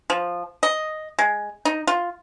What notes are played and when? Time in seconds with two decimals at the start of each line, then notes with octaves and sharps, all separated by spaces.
0.10 F3
0.63 D#5
1.19 G#3
1.65 D#4
1.87 F4